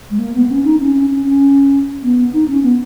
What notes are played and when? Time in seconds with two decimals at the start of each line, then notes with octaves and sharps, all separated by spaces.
0.11 G#3
0.19 A#3
0.34 B3
0.50 C#4
0.64 D#4
0.80 C#4
0.95 C#4
1.11 C#4
1.26 C#4
2.03 B3
2.33 D#4
2.48 C#4
2.63 B3